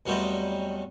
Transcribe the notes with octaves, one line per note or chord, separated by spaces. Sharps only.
E2 F#3 G3 A3 C4 D#5